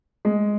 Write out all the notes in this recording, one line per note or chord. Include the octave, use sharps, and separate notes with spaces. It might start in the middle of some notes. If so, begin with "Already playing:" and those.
G#3